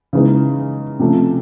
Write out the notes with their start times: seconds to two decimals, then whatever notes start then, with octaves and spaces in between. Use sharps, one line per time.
0.13 C#3 E3 G#3 B3 D#4
0.99 C3 F3 A3 C#4